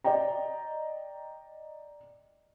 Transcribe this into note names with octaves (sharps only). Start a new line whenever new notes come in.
D5 D#5 G5 A#5